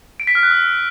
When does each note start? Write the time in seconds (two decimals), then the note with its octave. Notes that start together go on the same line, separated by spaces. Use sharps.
0.20 D7
0.27 B6
0.35 F6
0.43 F#6
0.51 E6